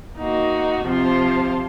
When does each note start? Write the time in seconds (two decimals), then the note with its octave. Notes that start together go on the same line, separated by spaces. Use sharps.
0.18 A#3 D#4 F#4
0.85 C3 F3 C4 F4 C5